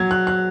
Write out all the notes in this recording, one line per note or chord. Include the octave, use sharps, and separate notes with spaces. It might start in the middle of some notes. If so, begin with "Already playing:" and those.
Already playing: F#3 G#6
F#6
F#6